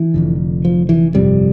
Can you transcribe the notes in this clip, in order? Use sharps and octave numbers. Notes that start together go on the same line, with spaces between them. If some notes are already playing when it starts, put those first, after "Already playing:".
Already playing: E3
F1 F2 D3
F3
E3
G1 F2 C3 G3